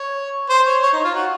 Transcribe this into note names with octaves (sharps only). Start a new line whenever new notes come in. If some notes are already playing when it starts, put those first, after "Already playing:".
Already playing: C#5
C5
C#5
C#5
D#4
F4
F#4